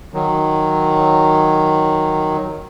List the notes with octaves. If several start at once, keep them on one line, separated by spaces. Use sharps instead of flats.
D#3 F#3